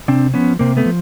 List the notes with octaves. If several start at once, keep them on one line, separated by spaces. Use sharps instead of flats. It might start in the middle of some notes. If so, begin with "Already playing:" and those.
C3 C4 D4
F3 B3 C#4
C3 A#3 C4
A3 B3
F3